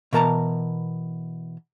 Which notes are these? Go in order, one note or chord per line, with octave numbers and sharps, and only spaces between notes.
B2 E3 A#4 A5 A#5